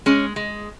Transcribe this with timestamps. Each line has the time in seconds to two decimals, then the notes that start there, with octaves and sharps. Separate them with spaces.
0.06 G#3 C#4
0.36 G#3